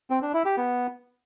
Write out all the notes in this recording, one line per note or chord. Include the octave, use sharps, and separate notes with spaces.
C4
D4
E4
G4
B3